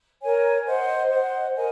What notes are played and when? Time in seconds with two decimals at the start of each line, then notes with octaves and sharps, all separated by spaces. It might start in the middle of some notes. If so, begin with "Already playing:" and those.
0.21 A#4 C#5 G#5
0.66 C5 D#5 F#5
1.11 C5 D#5 F#5
1.56 A#4 D#5 G#5